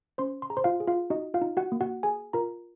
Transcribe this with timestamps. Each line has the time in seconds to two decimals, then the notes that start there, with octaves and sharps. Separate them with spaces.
0.18 C#4 C5 C6
0.42 C6
0.50 G#4 A#5
0.57 C5 C6
0.64 F4 F5
0.80 G#4
0.88 F4 F5
1.10 D#4 F#4 D#5
1.34 F4 F5
1.41 D#4
1.57 F#4 F#5
1.72 A#3
1.81 F#4 F#5
2.03 G#4 G#5
2.33 F4 A#4 A#5